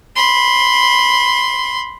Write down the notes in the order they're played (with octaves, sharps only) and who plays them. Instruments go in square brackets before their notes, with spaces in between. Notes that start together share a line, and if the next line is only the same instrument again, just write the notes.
[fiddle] B5 C6